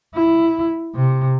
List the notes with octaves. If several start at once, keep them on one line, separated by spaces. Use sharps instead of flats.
E4
C3